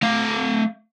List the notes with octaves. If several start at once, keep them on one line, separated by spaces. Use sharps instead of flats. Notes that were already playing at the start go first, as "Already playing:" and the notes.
A3 F5